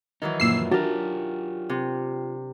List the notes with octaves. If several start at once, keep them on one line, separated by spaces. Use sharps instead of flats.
D#3 E3 F#3 D#4
F#2 A#2 F3 A#3 E6 C7
F#3 D4 F4 G4 A#4
C3